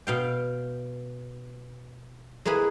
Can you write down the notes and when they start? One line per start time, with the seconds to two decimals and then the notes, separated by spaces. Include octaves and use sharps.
0.07 B2 F5 G5
2.45 G#3 A#3 E4 G#4 B4